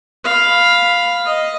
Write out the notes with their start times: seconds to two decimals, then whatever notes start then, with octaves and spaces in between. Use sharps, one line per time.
0.24 F5 B5
1.25 D#5